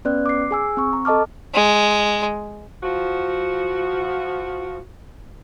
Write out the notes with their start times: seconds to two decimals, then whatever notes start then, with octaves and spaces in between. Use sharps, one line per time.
0.05 B3 C#4 B4 D5 F#6
0.26 D6 C7
0.51 G#4 G#5 E6
0.77 C4 C#6
0.93 A#5
1.05 A4 D#5 A5 D6 F6
1.54 G#3
2.83 F3 F#4